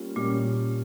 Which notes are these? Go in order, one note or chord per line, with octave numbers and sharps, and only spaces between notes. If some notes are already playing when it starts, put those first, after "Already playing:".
Already playing: G3 A#3 C#4 F4
A#2 G3 A#3 C#4 F4